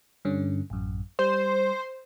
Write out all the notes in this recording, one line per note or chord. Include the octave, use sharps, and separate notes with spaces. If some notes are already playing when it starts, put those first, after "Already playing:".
G2 D3 C#4
A1 F#2
G3 C5